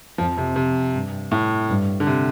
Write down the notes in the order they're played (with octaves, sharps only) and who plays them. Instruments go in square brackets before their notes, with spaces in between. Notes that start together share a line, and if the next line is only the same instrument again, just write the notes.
[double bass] F2 [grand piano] F3
[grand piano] C3
C3
[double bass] G2
[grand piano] A2
[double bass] G2
[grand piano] D3
C3